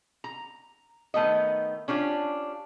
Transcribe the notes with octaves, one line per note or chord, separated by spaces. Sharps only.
A#5
D#3 A3 B3 D#5
C#4 D4 F4 G4